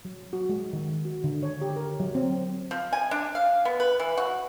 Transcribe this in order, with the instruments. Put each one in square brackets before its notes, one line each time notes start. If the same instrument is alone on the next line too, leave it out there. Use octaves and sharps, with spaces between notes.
[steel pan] F#3
F#4
G#3
D#3
F#4
D3
C#5
G4
A#4
F#3
C4
[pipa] F3
G#5
D4
F5
B3
B4
E3
F#4